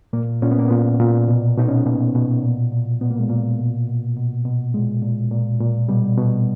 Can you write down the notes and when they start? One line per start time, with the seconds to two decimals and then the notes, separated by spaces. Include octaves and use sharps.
0.13 A#2 A#3
0.42 A#2 C#4
0.51 B3
0.59 A#3
0.68 A#2 B3
1.00 A#2
1.28 B2
1.57 B2 D#4
1.68 C#4
1.77 B3
1.86 B2 A#3
2.14 B2
2.43 A#2
2.72 A#2
3.01 A#2 B3
3.10 A#3
3.20 G#3
3.29 A#2 A#3
3.58 B2
3.87 B2
4.17 B2
4.45 B2
4.74 A#2 G#3
5.02 A#2
5.31 A#2
5.60 A#2
5.89 B2 G3
6.18 B2